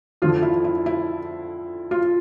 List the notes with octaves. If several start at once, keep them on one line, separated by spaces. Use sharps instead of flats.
F2 D3 F3 F4
E4
E4
E4
F4